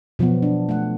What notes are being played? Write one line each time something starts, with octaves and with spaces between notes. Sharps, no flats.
B2 F3 F#3 B3
D4
A3 F#5